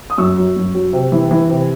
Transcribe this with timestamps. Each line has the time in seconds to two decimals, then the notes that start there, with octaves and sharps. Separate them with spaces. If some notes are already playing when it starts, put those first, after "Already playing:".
0.10 D#6
0.18 F#2 C#6 E6
0.38 F#3
0.56 F#2
0.75 F#3
0.93 C3
1.12 E3
1.31 E3
1.49 C3